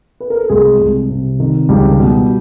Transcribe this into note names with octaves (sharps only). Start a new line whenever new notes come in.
B4
A#4
A4
C2 G#3 G#4
C2
C3
D#3
C#2 G3 G4
B2